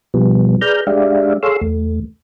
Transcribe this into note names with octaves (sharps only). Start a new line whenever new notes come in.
B2 F3 G3 B3
G#4 B4 D5 A#5 F6 G6
G#3 D4 G4 D5 E5 F5
G#4 A4 C#5 F5 C6 E6
E2 A3